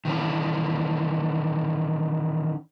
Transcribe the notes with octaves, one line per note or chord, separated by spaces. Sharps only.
D#3 E3 C#4